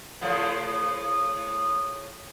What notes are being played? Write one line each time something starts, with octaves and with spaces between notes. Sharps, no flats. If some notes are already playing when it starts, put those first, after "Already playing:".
A2 C#3 F3